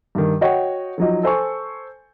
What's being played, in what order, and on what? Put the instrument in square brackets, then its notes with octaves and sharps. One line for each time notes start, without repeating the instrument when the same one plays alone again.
[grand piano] G2 D#3
F#4 C#5 D#5 G5
F3 F#3 D#4
A4 C5 G#5 C#6